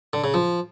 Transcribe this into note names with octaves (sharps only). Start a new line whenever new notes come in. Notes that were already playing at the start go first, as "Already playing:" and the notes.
D3
C#3
F3